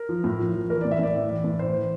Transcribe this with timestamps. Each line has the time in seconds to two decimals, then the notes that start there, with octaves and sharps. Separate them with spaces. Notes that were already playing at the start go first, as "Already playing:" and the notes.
Already playing: A#4
0.09 F3
0.24 A2
0.39 F3
0.54 F3
0.70 E3 A#4
0.81 A2 D5
0.91 E5
0.99 A2 D5
1.15 E3
1.30 E3
1.44 A2
1.59 E3 C5
1.75 E3